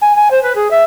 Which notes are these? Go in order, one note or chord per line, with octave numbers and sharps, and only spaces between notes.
G#5
G#5
C5
B4
G#4
E5